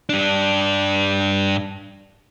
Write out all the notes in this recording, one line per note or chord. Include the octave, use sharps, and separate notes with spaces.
G2 D4